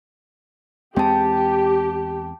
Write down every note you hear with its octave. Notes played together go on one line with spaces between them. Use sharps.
E2 G#3 C4 G4 G5 A5